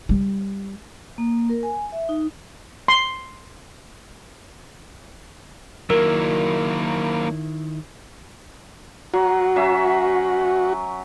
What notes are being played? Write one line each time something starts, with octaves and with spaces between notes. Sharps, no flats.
G3
A#3
A#4
G#5
E5
D#4
C6
D#3 F#3 A#3 E4 A#4 E5
F#3 F#4
F#3 C#4 E5